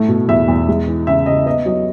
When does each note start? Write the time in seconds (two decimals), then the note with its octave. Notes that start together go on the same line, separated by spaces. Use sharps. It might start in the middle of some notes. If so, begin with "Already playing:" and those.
Already playing: A2 A3
0.08 B2
0.28 E2 E5
0.48 E2
0.68 G#3
0.88 E3
1.07 C#3 E5
1.26 C#3 D#5
1.46 B3 D#5
1.65 F#3 D#5